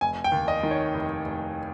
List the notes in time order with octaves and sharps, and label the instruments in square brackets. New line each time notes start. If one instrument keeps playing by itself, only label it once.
[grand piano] F1 G#5
G5
D#2
D#5
D#3
C#5
F1
F1